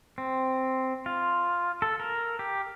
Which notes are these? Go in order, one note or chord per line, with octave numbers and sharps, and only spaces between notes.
C4
F4
A4
A#4
G4